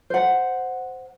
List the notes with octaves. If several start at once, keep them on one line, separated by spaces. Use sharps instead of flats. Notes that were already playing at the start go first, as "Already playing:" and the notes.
C5 F#5